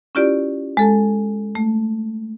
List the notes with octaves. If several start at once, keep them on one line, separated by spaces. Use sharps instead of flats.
C#4 E4 F4 G4 D5
G#3 A4 A5
A3